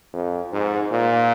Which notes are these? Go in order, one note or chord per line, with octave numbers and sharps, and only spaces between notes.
F2
G#2
A#2